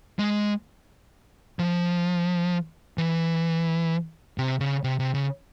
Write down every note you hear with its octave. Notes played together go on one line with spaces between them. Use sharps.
G#3
F3
E3
C3
C#3
C3
C3
C#3